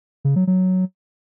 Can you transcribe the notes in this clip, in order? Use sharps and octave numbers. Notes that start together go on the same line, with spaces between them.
C#3
F#3
F#3